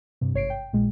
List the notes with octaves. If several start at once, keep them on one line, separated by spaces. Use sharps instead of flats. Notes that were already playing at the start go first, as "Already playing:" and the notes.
G2 C3
G#1 C#5 C7 D7
G5
A#1 A#2 G#3